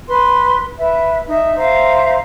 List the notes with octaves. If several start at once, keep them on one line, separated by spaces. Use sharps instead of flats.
B4 C6
B4 E5
D#4 E5
C5 E5 F5 A#5